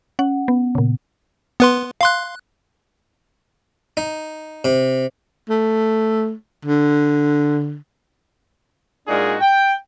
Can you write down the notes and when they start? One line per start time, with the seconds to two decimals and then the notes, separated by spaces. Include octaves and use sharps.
0.19 C#4 F#5
0.48 B3
0.75 A#2 C#3
1.60 B3 B4 C6
2.01 F5 C6 F#6
3.97 D#4
4.65 C3
5.50 A3
6.65 D3
9.08 A#2 G#3 D4 D#4 F#4 G#4
9.41 G5